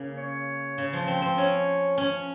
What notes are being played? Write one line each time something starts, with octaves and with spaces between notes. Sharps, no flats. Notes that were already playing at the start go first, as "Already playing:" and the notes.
Already playing: C#3 A#3
C#5
C#3
F3
C4
C4
C#4 C#5
C#4